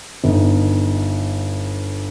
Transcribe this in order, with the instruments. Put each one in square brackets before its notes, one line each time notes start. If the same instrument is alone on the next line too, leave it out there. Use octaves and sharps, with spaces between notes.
[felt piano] G1 D#4